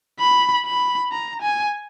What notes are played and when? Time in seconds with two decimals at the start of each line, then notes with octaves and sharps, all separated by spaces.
0.20 B5
0.66 B5
1.12 A#5
1.42 G#5